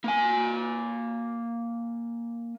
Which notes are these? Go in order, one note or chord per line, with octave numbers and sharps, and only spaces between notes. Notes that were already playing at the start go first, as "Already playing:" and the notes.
A#3 G#5